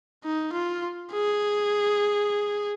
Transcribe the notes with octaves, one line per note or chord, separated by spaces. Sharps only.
D#4
F4
G#4